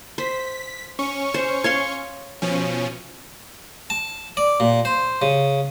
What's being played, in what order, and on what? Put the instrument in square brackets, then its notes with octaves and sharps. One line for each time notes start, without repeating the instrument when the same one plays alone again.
[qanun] C5 [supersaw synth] B6
[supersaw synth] C#4 C#6
[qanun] C5
C#5 F5 C6
[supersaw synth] B2 F3 C#4
[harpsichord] A5
D5
A#2
C5
C#3